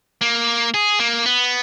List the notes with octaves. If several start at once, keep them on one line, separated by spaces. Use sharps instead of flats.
A#3
G#4
A#3
B3